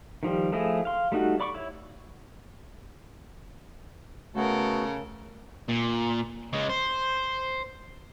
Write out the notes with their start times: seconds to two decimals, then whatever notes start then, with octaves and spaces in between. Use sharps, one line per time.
0.23 D#3 F3 G3
0.52 F3 A3 E4 G#4 D#5
0.85 F5 C6
1.12 G3 A3 D#4 F#4
1.40 D5 B5 C#6 D6
1.54 E4 C#5
4.35 C#3 A3 B3 F#4 A4 A#4
5.68 A#2
6.53 C#3 G#3
6.69 C5